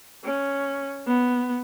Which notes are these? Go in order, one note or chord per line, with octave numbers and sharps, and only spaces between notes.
C#4
B3